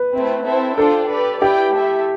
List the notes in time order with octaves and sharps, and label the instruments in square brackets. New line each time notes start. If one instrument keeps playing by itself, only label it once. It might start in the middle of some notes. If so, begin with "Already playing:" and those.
Already playing: [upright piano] B4
[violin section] A3 C4 E4
C4 E4 A4 C5 E5
[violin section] D4 F4 C5 G5 [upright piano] A4
[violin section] G4 B4 D5
[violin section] E4 B4 D5 G5 [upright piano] G4
[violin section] A3 E4 A4 E5